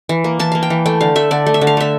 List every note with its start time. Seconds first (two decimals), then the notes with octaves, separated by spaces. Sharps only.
0.09 E3
0.24 A#3
0.39 E3 A5
0.52 A#3 F5
0.63 G5
0.70 E3
0.86 A3 G5
1.01 D3 F5
1.15 A3 E5
1.31 D3 D5
1.46 A3
1.54 E5
1.61 D3
1.67 F5
1.77 A3 E5